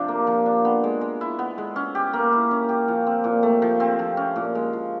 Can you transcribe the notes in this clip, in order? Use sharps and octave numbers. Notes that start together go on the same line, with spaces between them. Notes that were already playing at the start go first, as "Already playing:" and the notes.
Already playing: C3 F3 D4
A#3
F3
D4
B3
G#3
G#3
E4
B3
G#3
C#4
G4
A#3
E4
C#4
G4
F3
C4
A#2
A3
F3
C4
F3
C#4
A#2
G#3
F3